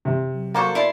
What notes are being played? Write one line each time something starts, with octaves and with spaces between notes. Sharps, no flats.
C3
F#3
A#3 F#4 A4 C5 D5
E4 D5 A5 C6